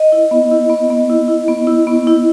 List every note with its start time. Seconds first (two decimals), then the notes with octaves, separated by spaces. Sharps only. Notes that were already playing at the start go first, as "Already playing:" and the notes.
Already playing: D#5
0.12 E4
0.31 B3
0.51 E4
0.70 B3
0.90 B3
1.10 E4
1.28 E4
1.48 B3
1.67 E4
1.87 B3
2.07 E4